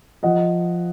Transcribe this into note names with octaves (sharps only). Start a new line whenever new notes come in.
F3 D#5 F#5